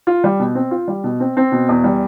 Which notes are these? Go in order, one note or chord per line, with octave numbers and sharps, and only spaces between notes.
F4
G3
B2
C4
F4
G3
B2
C4
C4
B2
E2
G3